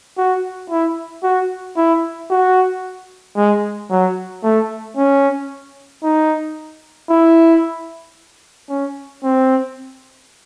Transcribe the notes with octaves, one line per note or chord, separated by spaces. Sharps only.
F#4
E4
F#4
E4
F#4
G#3
F#3
A3
C#4
D#4
E4
C#4
C4